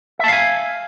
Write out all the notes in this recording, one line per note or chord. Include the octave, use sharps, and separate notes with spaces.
E5 F5 G#5 A5